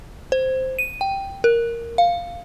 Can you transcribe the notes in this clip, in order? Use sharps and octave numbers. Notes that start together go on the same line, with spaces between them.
C5
D#7
G5
A#4
F5